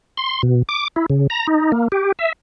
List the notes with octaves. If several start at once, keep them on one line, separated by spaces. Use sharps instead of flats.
C6
B2
D6
E4
C#3
A#5
D#4
A#3
G4
E5